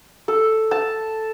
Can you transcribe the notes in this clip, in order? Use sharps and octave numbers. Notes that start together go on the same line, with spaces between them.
A4
A5